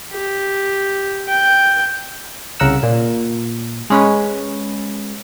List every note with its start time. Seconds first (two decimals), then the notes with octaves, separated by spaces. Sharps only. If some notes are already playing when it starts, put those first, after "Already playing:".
0.12 G4
1.28 G5
2.60 C2 C#3 A#4 F#5 E6
2.83 A#2
3.90 G#3 C#4 B4